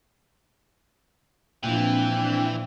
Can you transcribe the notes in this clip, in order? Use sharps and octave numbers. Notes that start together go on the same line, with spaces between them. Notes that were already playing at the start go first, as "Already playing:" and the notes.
A#2 E3 F3 C4 D4 G5